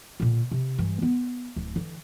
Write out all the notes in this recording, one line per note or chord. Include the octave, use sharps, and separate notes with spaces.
A#2 D3
C3
G2 E3
B3
D1
D3 E3